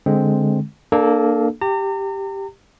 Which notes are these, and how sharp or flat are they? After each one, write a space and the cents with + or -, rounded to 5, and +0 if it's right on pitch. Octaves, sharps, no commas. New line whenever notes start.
D3 +0 G#3 +0 C4 +0
A#3 +0 D4 +20 A4 -25
G4 +0 A#5 -40